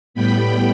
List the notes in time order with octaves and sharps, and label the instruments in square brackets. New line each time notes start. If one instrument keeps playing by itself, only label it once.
[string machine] A2 G3 B3 G5 B5